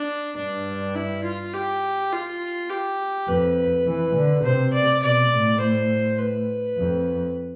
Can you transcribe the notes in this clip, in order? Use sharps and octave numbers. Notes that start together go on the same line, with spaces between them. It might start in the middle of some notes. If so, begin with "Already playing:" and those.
Already playing: D4
G2 D4
E4
F4
G4
F4
G4
F2 B4
E3
D3
C3 C5
D5
B2 D5
A2
C5
B4
F2